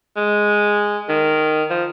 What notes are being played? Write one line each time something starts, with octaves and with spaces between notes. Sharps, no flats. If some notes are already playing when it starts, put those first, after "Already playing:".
G#3
D#3
F3